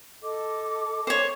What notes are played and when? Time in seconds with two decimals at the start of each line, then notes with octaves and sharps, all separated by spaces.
0.23 A4 D#5 D6
1.07 C5 C#5